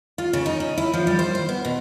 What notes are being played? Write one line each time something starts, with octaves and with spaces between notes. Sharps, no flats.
F4
C#3
D#4
C#4
E4
F3
G3
C5
C5
B3
B2